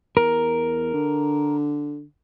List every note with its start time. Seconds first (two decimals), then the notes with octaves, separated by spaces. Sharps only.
0.17 E2 A#4
0.94 D3